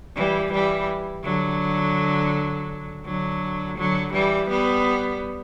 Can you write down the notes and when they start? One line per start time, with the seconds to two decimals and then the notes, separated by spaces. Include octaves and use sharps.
0.16 E3 G3
0.52 E3 G3
1.24 D3 F#3
3.05 D3 F#3
3.77 D3 F#3
4.13 E3 G3
4.49 G3 B3